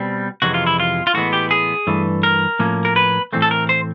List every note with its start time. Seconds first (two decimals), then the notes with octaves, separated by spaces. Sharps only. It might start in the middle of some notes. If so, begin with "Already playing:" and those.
Already playing: B2 G3 C4
0.42 F2 C3 E3 G#3 C#4 F#4
0.54 F4
0.67 E4
0.80 F4
1.07 F4
1.14 A2 E3 G#3 B3 F#4
1.33 G4
1.51 G#4
1.87 G2 E3 A3
2.23 A#4
2.59 A2 F3 A#3 C#4
2.85 A#4
2.96 B4
3.33 A2 E3 A3 C4
3.42 A4
3.51 A#4
3.69 C5